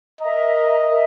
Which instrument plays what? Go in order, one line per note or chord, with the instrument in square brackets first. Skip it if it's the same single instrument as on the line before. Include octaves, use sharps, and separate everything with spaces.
[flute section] A#4 E5 A#5 [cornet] D#5
[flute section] A#4 E5 A#5